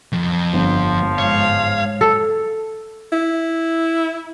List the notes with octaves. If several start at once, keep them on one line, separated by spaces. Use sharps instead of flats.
F2
G1 F3
G#2 C#5 F5
A4
E4